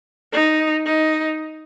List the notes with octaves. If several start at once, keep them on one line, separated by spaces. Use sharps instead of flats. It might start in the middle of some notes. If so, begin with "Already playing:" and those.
D#4
D#4